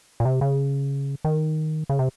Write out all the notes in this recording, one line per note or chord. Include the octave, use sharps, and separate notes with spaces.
A#2
C3
C#3
D#3
C#3
C3